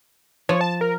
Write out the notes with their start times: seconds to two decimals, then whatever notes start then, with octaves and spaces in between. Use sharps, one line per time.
0.49 F3 C#5
0.61 A5
0.81 A#4